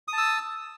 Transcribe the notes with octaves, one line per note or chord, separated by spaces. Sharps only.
A5 D#6 E6